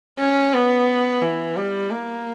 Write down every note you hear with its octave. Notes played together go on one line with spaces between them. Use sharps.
C#4
B3
E3
G3
A#3